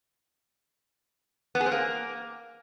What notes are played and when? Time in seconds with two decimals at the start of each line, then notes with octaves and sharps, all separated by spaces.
1.55 B3
1.60 G#4
1.66 C4
1.72 A#3